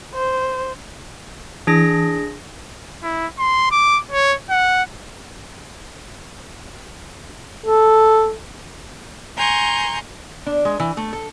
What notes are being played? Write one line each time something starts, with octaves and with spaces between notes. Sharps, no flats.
C5
E3 D4 G#4 A#6
E4
C6
D6
C#5
F#5
A4
G#5 A#5 C6 C#6 G6
D4
G#3
E3
A3
A4